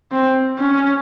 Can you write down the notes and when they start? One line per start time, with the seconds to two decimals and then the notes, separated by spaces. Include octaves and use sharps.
0.11 C4
0.58 C#4